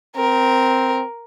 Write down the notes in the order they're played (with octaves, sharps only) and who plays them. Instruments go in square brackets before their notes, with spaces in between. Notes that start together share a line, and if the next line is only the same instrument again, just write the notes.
[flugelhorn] C4 [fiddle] A#4